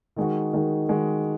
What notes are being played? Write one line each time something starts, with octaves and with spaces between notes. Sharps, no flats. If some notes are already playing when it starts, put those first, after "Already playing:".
D#3 G#3 D#4 F#4
D#3 G#3 D#4 F#4
D#3 G#3 D#4 F#4